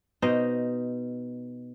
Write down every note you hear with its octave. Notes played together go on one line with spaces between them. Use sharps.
B2 D#4 C5 D#5